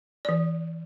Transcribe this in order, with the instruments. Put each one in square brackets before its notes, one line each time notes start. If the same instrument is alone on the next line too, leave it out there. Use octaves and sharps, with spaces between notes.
[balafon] E3 D5